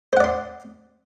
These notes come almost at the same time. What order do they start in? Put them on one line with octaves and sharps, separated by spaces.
C5 F#5 D5 C6